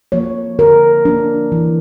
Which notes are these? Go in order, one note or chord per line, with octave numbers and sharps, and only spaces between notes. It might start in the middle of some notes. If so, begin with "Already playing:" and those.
F3 A#3 C#5
D3 A#4
F3 A#3 D4
E3